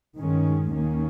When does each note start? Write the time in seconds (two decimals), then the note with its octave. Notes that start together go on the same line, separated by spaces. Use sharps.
0.16 G2 D#3 G#3 C#4
0.71 D#2 D#3 A#3 C#4